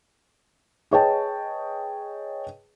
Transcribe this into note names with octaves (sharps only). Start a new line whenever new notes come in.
G#4 B4 C#5 D#5 G5 A5